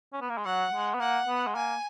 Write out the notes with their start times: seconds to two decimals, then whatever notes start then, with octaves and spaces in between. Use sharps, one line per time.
0.13 C#4
0.21 B3
0.29 A#3
0.38 G#3
0.45 F#3 F#5
0.73 G#3
0.94 B3
0.99 A#3 F#5
1.28 B3
1.47 G#3
1.55 A#3 G#5